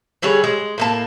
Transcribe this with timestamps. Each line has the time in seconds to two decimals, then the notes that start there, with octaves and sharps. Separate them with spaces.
0.22 D3 G3 G#4 C#5
0.44 G#3
0.78 A2 A#3 A5